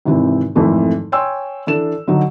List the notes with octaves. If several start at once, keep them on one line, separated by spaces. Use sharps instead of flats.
G#1 C3 E3 C4
G#1 F2 E3 A3
C#5 G5 G#5 C6 E6
E3 D4 A4 E7
D3 F#3 D#4